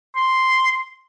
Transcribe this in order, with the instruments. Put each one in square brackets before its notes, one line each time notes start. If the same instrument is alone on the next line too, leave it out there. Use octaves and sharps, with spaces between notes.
[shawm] C6